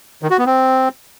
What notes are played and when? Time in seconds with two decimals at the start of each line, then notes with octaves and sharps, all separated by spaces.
0.23 D#3
0.30 F#4
0.38 B3
0.46 C4